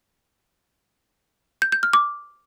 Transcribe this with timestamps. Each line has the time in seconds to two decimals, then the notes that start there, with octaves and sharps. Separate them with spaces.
1.62 G6
1.72 G6
1.83 F6
1.93 D6